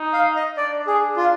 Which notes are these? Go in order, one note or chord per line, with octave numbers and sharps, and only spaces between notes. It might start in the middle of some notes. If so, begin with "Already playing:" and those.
Already playing: D#4
F5
D#5
D4 D5
G#4
F4